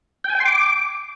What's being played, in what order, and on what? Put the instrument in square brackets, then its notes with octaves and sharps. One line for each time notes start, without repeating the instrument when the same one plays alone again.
[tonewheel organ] G5
G#5
G5
C6
D6